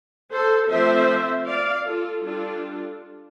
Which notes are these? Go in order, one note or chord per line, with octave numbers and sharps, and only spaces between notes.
A4 C5
F3 A3 C4 C5 E5
D5 F5
F4 A4
G3 D4 F4 A4